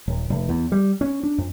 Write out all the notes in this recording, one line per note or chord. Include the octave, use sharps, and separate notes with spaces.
D#1
F1
E2
G3
C#4
D4
F2